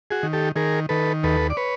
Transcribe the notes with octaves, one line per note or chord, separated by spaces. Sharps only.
F#4 G#4
D#3
G4 A4
D#3 G#4 A#4
D#3 A4 B4
D#2 A4 B4
D5
B4 C#5